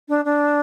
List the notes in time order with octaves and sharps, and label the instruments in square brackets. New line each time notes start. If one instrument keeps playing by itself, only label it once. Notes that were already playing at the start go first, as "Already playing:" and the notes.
[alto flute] D4
D4